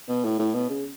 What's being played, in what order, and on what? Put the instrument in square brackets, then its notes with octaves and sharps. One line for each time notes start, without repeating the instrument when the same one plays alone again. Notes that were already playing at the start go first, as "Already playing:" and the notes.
[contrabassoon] B2
A2
A2
B2
C#3